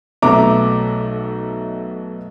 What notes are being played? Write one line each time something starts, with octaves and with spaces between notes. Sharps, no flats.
B1 B2 A3 E5 A#5 D6